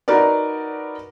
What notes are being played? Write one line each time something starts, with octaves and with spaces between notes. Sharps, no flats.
D#4 F#4 A#4 B4 D5